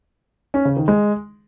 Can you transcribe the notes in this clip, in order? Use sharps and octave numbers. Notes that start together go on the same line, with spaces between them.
C#4
C#3
D#3
G#3